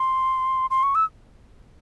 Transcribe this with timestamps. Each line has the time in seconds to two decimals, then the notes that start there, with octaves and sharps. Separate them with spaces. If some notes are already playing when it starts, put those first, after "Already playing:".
Already playing: C6
0.70 C6
0.83 C#6
0.95 E6